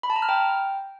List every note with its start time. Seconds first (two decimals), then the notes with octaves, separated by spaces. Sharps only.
0.03 B5
0.10 A5
0.16 A#5
0.22 F6
0.29 G5